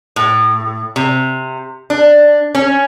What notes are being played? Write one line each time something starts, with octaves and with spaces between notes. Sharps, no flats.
A2
C3
D4
C#4